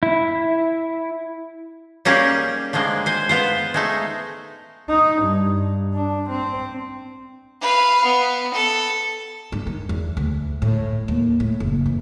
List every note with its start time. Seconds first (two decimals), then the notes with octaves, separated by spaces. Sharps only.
0.03 E4
2.05 G3 A#3 C#4 D#4 G4 G#4
2.73 D3 D#3 F3 G#3 A#3
3.06 C5 G#5
3.29 B3 F4 C5
3.74 G#3 A3 D#4
4.89 D#4
5.22 G2
5.94 D4
6.30 C4
7.61 B4 F5
8.04 B3
8.54 A4
9.52 G2
9.67 D#3
9.89 E2
10.17 D2
10.62 A2
11.08 D#2
11.40 A2
11.60 F#1
11.86 E3